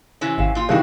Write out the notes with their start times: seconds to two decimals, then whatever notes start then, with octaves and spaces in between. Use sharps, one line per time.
0.21 C3 E3 C#4
0.38 G#1 G4 F5 E7
0.55 A#2 F4
0.69 C3 D#3 E3 D4 F#4 G4 F5 G6